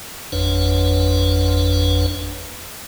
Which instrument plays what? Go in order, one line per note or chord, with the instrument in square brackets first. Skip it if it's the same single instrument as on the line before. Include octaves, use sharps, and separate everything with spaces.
[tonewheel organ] G#1 F2 D4 B4 C#5 F#5